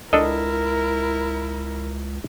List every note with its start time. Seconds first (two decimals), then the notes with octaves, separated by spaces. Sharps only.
0.13 C#2 D4 E4 A4 A#4 D#5